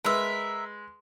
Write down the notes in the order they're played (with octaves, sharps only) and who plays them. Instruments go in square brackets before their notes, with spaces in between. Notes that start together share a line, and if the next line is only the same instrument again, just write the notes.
[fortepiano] G#3 B4 [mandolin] A#4 E5